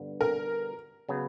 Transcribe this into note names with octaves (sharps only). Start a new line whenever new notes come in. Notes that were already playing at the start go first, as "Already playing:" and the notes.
Already playing: G2 D3 B3
A#4
C#3 F#3 B3